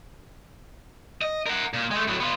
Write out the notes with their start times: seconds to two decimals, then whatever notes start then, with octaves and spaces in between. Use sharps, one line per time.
1.21 D#5
1.46 A#4 F#5
1.74 A#2
1.91 G#3 A3
2.08 A2 F#3
2.20 B3 F4